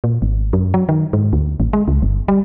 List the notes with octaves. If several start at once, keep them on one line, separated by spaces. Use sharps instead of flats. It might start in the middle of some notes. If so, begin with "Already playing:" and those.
A#2
G#1
F#2
F#3
D#3
G#2
D2
A1
G#3
C#2
G1
G3